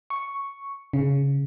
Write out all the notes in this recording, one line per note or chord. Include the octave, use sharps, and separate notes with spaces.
C#6
C#3